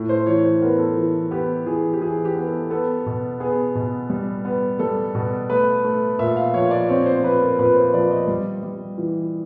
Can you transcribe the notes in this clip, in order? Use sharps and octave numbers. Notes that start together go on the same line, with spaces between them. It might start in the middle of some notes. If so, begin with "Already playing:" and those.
Already playing: A2
C5
E3 C#5
C5
B3 A#4
A4
E3
B3 G4
E3 G#4
G4
E3 G#4
G4
B3
A4
B3 A4
B2
B3 G#4
B2
G3
B3
G3 A4
B2
A3 B4
A3
A#2 E5
F5
F3 C#5
D5
C4 C#5
C5
F3 B4
A#4
A#2 B4
C5
F3 D5
D#5
G3
G3
E3